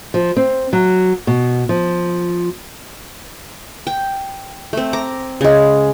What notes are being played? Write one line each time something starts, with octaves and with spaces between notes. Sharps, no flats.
F3
C4
F#3
B2
F3
G5
A3 C4
A#5 D6
C#3 G#3